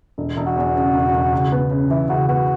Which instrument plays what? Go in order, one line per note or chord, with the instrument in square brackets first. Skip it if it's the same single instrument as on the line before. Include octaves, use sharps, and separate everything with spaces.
[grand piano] E1
E1
[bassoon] F#4
[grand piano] E2
C#3
E1
E1
C#2
B3
C#3
[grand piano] E3 [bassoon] E4
[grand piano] C#2 [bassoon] F#4
[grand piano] B3 [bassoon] F#4